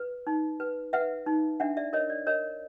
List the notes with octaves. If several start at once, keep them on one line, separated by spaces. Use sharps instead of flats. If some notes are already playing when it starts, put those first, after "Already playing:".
Already playing: B4
D#4
B4
B4 E5 F#5
D#4
D4 E5 F#5
D5 E5
A#4 C#5 D#5
D5
A#4 C#5 D#5